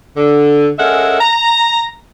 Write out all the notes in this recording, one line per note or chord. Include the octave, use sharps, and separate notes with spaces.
D3
G#3 C#4 A4 A#4 E5 F#5
A#5